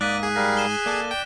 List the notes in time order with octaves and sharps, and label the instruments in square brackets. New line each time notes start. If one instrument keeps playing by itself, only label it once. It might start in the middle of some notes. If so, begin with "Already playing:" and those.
[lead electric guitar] G#2 [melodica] A#3 D#6 [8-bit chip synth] D5 [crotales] F#6 B6 D#7
[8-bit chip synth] G#4
[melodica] G3 A#4 F5 [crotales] A#6
[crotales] E7 G7
[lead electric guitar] A#3 A4 [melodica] D5
[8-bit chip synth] G5